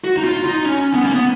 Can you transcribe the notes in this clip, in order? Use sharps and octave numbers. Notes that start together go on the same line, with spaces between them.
F#4
D#4
F4
D#4
C#4
B3
A#3
B3